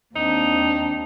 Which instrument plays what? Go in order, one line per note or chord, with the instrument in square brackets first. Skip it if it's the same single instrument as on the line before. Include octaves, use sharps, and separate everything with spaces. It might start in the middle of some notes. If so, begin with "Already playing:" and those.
[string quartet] D#2 C4 D4 [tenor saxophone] D#4